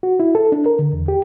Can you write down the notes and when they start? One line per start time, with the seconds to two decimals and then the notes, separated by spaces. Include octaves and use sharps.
0.03 F#4
0.20 E4
0.35 A4
0.52 D4
0.66 A#4
0.79 D3
0.93 E2
1.08 G4